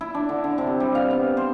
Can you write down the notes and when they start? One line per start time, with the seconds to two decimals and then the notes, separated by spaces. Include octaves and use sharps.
0.01 E4
0.15 D4
0.29 D3
0.44 D3
0.58 C3
0.80 G3
0.95 F5
1.11 B3
1.37 C5